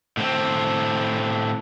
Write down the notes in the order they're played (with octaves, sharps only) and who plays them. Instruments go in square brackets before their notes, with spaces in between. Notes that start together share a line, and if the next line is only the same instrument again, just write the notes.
[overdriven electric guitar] A2 C4